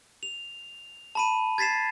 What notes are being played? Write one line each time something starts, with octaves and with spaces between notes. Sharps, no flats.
F7
A5 B5 D#7
G#6 A6 B6 C7 E7